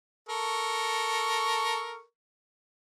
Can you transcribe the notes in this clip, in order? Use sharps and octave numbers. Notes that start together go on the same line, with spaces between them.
A4 A#4 C#6